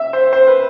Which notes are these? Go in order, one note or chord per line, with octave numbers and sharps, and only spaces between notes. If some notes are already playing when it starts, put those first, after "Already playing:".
Already playing: E5
C5
C5
B4